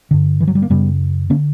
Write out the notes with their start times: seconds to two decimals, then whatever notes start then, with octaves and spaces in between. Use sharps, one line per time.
0.11 G2 D3
0.40 E3
0.47 F#3
0.55 G3
0.62 A#3
0.70 F#2 C#3 G3 B3
1.30 D3 A#3 C#4